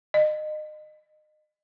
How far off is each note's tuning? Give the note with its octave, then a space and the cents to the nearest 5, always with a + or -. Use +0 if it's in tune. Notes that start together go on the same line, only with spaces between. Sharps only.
D#5 -30